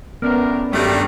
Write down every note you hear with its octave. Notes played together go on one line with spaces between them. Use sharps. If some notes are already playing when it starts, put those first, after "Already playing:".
A2 B3 C#4 D4 A#4
G2 D#3 F#3 G3 A3